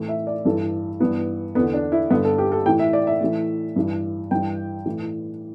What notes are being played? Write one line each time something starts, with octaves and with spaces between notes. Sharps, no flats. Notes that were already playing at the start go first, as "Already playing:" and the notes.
Already playing: A2 E3
E5
D5
G2 E3 A4
G2 E3 B3
E2 D3 B3
D4
E4
G2 D3 B3
A4
G4
A4
A2 E3 G5
E5
D5
E5
A2 E3
G2 E3
G2 E3 G5
A2 E3